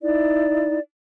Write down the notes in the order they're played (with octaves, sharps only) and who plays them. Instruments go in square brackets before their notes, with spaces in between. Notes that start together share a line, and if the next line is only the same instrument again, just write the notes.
[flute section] D#4 E4 D5